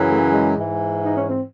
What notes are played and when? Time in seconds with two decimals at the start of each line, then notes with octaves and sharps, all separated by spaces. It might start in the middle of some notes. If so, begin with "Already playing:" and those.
Already playing: F#2 C#3 E3
0.11 A3
0.33 G#3
0.55 G#2 E3
1.05 D#4
1.17 C#4
1.30 C4